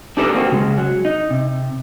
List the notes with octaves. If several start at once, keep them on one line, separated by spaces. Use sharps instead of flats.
D4 D#4 G4 A4 B4 D5
A#3 C4 F#4
C#3 G#3
F#3
D#4
C3